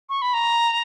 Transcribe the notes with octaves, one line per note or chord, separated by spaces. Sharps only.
C#6
B5
A#5